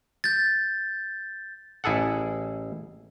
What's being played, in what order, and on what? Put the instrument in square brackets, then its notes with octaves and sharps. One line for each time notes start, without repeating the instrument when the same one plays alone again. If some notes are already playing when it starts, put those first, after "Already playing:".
[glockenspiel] G6 A6
[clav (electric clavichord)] A1 E4 G#4 A4 F#5